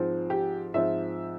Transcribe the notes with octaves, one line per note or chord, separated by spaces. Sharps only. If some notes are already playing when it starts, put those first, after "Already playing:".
Already playing: G#2 F3 C4
G4
G#2 F3 C4 E5